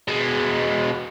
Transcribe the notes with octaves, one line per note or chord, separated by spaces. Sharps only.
B2 G#3